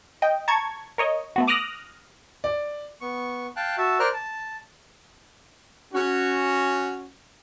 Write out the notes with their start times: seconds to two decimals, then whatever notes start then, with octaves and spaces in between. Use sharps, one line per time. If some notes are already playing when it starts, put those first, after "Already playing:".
0.22 D#5 G5
0.48 A5 A#5 C#6 G#6
0.98 A#4 C#5 D#5
1.36 A3 B3 F#4
1.47 D6 D#6 F6 F#6 A#6
2.44 D5
3.01 B3 C#6
3.56 F5 G5 A5 F#6
3.78 F#4 E5 A5
3.99 A#4 C5 D5 A#5 F6 F#6
4.14 A5
5.93 C#4 F#4